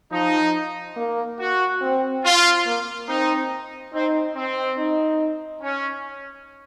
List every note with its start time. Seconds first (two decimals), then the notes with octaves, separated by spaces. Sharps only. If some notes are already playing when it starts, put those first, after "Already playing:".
0.11 F3 D#4
0.96 A#3
1.39 F#4
1.81 C4
2.24 F4
2.66 A#3
3.08 C4 D#4
3.93 C4 D#4
4.35 C4
4.78 D#4
5.62 C#4